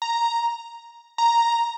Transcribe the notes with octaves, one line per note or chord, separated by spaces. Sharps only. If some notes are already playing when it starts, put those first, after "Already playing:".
A#5
A#5